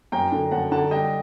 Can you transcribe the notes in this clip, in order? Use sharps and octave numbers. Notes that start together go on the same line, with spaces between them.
F#2 G5 A#5
D3
F#2 F#5 A5
D3 F#5 A5
G3 D#5 G5